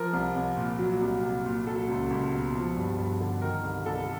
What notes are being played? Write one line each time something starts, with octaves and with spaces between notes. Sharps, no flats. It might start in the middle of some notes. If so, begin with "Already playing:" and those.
Already playing: F3 A#4
C2
C2
A#2
F#3
C2
C2
A#2
F#3 A4
C#2
C#2
B2
F3
G2
G2
D3
D#3 A#4
C2
C2 A4